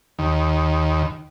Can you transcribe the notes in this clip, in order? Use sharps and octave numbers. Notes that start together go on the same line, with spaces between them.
D#2